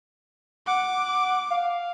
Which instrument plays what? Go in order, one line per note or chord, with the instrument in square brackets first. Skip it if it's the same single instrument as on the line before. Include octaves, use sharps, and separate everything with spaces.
[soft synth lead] F#5 [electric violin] D6
[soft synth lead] F5